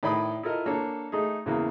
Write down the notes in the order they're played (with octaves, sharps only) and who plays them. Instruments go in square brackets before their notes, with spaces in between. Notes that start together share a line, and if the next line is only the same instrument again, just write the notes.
[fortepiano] A2 D#3 D5 B5 D#6
E4 F4 A4 A#4 D#5
A#3 D4 A4 C#5 A5
A3 D#4 G#4
E2 C#3 E3 A#3